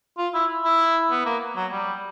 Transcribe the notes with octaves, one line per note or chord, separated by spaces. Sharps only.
F4
E4
E4
B3
A#3
F#3
G3